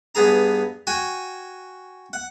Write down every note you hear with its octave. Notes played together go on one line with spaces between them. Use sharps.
G2 B3 G#4 A#5
F#4 G5 G#5
F#5